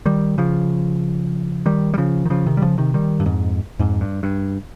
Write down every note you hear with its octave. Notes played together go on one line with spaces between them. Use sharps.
D#3 G3
C#3 F3
D#3 G3
G3
C#3 F3
D#3
C#3 F3
C3 D#3
G3
C#3 F3
C3 D#3
D#3 G3
G2
F2 G#2
F2 G#2
G2
G2